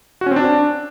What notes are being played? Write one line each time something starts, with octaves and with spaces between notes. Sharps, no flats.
F#4
C#4
C4
D4